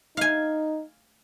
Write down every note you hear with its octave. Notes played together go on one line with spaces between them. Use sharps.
D#4 F5 G#5